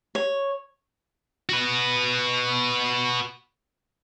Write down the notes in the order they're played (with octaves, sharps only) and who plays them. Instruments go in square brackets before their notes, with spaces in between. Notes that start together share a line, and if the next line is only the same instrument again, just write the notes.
[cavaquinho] C#5
[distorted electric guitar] F#4 B4